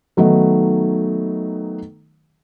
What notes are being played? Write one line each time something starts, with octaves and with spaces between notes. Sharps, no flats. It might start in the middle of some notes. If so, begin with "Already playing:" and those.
D#3 F#3 A3 B3 D#4